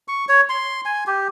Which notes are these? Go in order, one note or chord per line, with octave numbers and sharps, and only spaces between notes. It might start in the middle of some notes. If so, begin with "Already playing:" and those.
C#6
C#5
C6
G#5
G4